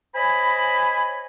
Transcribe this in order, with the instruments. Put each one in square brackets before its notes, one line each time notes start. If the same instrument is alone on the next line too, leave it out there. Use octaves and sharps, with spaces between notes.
[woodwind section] C5 C#5 D#5 G#5 B5